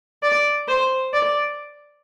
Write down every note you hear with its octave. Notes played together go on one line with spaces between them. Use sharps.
D5
C5
D5